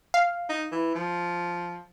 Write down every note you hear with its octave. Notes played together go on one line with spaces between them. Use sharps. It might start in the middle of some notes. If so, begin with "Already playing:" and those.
F5
D#4
E3
F3